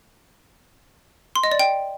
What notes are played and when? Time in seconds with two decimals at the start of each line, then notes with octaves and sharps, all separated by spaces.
1.36 C6
1.44 D#5
1.51 D5
1.59 G5